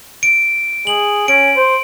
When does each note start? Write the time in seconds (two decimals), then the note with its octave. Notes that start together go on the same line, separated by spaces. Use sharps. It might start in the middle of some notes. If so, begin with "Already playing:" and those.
0.23 D7
0.87 G#4 F#7
1.28 C#4 D7
1.56 C5